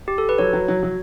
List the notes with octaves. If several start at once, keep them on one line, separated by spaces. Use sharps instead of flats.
G4
A4
B4
F#3 C#5
F#3
F#3
F#3